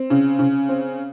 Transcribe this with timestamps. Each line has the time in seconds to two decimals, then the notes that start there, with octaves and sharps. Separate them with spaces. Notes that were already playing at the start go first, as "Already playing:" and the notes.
Already playing: C4
0.10 C#3
0.39 C#3
0.69 C4